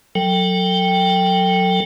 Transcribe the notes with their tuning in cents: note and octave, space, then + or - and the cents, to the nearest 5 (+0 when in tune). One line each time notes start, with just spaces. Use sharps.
F#3 -15 A4 +25 G5 +0